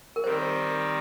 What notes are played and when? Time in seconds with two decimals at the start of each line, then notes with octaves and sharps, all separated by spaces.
0.16 A#4
0.24 D#3 G3 C4 D#4 C5